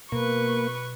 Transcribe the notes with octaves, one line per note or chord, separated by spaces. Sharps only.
B2 A#3 B4 C#6